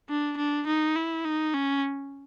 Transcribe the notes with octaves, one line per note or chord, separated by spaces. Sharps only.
D4
D4
D#4
E4
D#4
C#4